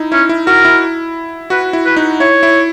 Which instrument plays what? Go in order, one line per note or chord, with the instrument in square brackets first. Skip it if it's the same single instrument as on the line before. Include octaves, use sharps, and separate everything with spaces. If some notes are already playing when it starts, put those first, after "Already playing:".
Already playing: [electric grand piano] D#4 E4
[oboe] C#4 [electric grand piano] E4
[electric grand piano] E4
[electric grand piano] F#4 [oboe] A#4
[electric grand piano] E4
[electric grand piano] F#4 [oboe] B4
[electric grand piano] E4
[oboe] B4
[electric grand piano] D#4
[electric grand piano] E4 [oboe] C#5
[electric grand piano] E4